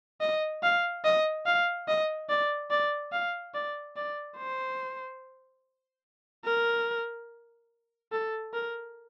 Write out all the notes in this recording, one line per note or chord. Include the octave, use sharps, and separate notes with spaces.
D#5
F5
D#5
F5
D#5
D5
D5
F5
D5
D5
C5
A#4
A4
A#4